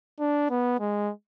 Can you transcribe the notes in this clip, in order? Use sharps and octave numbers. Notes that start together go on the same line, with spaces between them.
D4
B3
G#3